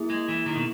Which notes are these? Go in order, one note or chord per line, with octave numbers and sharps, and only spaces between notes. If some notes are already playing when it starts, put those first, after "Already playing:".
Already playing: A#3 E4 G#4
G#3
E3
D#3
B2